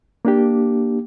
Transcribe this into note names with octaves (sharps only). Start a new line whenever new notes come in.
A#3 D4 G4